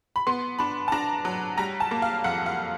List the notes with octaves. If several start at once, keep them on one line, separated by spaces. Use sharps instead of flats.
B5
B3 C6
D4 B5
A5
D4 A#5
F#3
G3 A#5
A5
A#3
F5
F2 F#5
F5